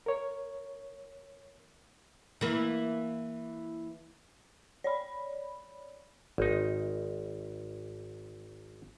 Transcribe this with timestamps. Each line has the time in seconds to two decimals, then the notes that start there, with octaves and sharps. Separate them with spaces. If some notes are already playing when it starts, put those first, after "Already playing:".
0.06 A#4 C#5
2.41 E3 A#3
4.84 C#5 D5 B5
6.38 G#1 D#4